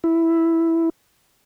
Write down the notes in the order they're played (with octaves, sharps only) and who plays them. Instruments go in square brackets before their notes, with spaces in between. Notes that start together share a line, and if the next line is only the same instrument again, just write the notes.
[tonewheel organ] E4